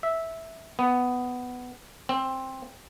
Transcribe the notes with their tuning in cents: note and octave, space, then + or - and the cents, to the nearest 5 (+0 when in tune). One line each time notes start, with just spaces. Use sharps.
E5 -10
B3 +10
C4 +10